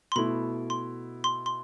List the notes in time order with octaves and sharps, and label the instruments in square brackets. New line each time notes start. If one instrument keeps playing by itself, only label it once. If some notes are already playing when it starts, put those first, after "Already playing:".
[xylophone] C6
[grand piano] B2 A3 E4 [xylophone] B5
[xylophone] C6
C6
C6